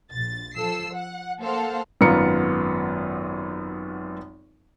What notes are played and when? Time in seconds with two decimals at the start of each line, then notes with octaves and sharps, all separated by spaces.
0.11 A#1 A6
0.55 F3 A4 E6 C7
0.94 F#5
1.40 A#3 A4 C5 F5 F#5
2.01 G#1 F#2 B3 F4 A#5 C#7